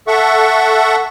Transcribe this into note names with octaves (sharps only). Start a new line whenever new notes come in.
A4 E5 F#5 C#6